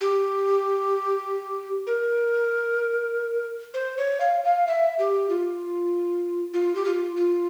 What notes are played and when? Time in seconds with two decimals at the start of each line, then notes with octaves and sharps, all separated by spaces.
0.01 G4
1.87 A#4
3.74 C5
3.97 C#5
4.20 F5
4.44 F5
4.67 E5
4.99 G4
5.29 F4
6.54 F4
6.75 G4
6.85 F4
7.16 F4